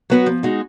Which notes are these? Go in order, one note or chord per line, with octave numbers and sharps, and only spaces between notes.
F#3 B3 F#4 B4
F3
G#3 D#4 F#4